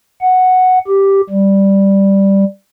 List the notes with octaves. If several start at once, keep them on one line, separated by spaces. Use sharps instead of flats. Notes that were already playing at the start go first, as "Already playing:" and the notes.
F#5
G4
G3